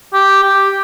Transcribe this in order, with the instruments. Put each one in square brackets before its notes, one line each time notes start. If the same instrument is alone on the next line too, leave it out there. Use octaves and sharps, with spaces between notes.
[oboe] G4
G4